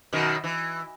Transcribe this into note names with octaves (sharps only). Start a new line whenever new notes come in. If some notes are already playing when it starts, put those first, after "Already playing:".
F#2 B2 D#3
E3